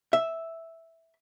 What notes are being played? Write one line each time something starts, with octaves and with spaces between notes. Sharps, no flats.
E5